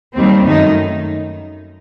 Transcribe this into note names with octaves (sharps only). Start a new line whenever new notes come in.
D#2 D#3 G3 C4
F#2 D#3 A3 D#4